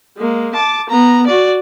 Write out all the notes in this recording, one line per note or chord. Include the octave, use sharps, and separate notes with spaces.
G#3 A#3
A5 D6
B3 A#5
F#4 D5